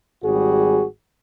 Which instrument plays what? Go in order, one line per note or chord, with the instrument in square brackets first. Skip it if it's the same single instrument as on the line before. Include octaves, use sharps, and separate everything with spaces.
[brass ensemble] G#1 G3 F#4 G#4